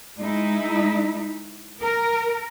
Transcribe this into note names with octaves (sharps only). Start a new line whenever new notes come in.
G#3 D#4 E4
A#4